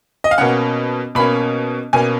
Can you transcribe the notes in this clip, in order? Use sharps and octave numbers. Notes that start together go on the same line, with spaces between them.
D#5
F5
B2 A#3 C#4 F#5
B2 A#3 C#4 B5
B2 A#3 C#4 G#5